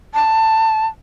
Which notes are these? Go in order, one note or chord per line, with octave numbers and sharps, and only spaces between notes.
A5